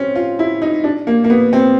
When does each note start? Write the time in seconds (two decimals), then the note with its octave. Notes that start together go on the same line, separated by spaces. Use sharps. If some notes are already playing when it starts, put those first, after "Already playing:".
Already playing: C4 C#4
0.15 F4
0.39 E4
0.62 D#4
0.84 D4
1.07 A#3
1.24 A#3
1.30 B3
1.53 C4